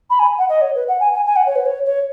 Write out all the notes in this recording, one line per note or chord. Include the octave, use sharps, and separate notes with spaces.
B5
G#5
F#5
D#5
C#5
B4
F#5
G#5
G#5
G#5
F#5
C#5
B4
C#5
C#5